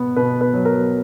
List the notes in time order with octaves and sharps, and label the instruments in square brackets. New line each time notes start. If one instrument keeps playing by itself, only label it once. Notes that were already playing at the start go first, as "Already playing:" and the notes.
Already playing: [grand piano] B2 B3
B2 B4
B4
F#3
A#4